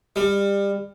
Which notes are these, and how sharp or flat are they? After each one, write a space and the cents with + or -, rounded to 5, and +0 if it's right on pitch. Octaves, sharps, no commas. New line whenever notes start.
G3 +25